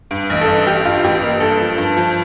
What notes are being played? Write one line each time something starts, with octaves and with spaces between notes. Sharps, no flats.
G2
A1
A4
G2
A1 G4
G2 F4
A1 G4
A#3
G2 A4
F3
G2
F3